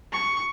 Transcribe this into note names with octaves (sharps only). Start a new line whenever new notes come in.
C#6